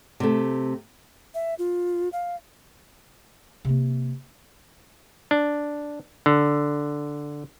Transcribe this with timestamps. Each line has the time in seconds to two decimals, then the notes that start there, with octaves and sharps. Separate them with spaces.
0.20 C3 A3
1.34 E5
1.59 F4
2.13 F5
3.65 C3 A#3
5.31 D4
6.26 D3